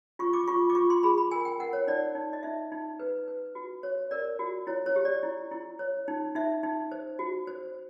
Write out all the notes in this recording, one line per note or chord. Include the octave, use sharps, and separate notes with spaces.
F4 C#6
D6
F4 C#6
D6
F4 C#6
C6
G#4 B5
B5
A#4 G#5
G5
A#4 F#5
C#5
D#4 D5
D#4
D#5
D#4 E5
D#4
B4
B4
F#4
C#5
A#4 D5
F#4
E4 C#5
C#5
G4
D5
E4
E4
C#5
D#4
D#4 E5
D#4
C5
F#4
C5